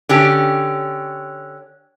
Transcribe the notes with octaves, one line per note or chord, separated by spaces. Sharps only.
D3 C#4 G4